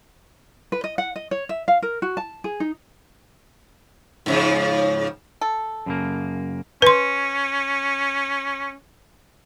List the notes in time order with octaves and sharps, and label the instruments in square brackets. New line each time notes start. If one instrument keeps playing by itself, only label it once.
[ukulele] B4
D#5
F#5
D#5
C#5
E5
F5
A#4
F#4
A5
G#4
D#4
[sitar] G#2 C#3 F3
[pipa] A4
[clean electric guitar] F#2 C#3 A#3
[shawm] C#4 [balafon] B4 C6